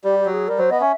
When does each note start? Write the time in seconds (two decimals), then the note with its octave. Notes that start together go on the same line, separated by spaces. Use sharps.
0.04 G3 G4
0.19 G4
0.25 F#3
0.33 G#4
0.48 G3 A#4
0.58 F#3 C5
0.70 B3 D#5
0.81 C#4 E5